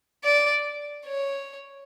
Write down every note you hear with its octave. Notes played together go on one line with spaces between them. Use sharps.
D5
C#5